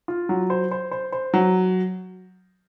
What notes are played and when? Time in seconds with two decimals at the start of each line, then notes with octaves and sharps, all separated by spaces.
0.08 F4
0.29 F#3
0.50 C5
0.71 C5
0.91 C5
1.12 C5
1.34 F#3